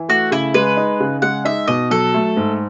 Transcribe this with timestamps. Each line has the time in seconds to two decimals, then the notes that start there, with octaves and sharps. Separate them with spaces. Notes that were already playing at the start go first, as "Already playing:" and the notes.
Already playing: E3
0.09 A3 F#4
0.31 C#3 E4
0.54 G#3 B4
0.77 D#4
1.00 C#3
1.22 G#3 F#5
1.45 D#4 E5
1.67 B2 D#5
1.90 F#3 A4
2.14 A3
2.37 G#2